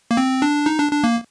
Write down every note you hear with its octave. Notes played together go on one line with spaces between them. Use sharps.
A#3
C4
D4
D#4
D4
D4
A#3